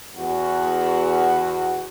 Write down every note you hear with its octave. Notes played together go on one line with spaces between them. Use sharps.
E2 F#4